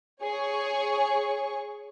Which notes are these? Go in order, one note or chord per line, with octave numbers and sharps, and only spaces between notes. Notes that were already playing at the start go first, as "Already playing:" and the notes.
G#4 C#5 C#6